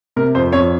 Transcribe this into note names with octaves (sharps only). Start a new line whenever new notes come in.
C3 A#4
F2 C5
F2 C#5